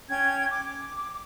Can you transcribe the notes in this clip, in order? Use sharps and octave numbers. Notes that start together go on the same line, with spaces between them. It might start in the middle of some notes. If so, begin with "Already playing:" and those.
C#4 G5 G#6
D6